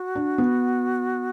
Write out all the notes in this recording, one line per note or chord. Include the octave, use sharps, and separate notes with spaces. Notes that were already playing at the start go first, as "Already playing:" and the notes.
Already playing: F#4
D4
B3